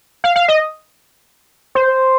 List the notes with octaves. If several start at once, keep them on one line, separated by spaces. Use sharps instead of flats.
F5
F5
D#5
C5